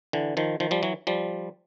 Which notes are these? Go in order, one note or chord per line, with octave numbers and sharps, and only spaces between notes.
D3 E3
D#3 F3
D#3 F3
F3 G3
E3 F#3
F3 G3